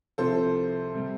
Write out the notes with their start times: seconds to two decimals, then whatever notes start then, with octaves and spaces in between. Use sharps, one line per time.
0.18 C2 C3 F3 A4 C5
0.95 C3 G3